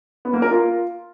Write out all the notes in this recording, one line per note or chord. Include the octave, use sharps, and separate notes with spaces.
B3
A#3
A#4
F4